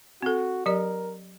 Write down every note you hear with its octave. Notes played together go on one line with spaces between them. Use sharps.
C4 F#4 A4
F#3 G4 A#4 D5